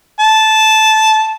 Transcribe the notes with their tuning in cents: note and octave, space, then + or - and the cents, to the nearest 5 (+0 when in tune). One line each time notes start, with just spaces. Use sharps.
A5 -10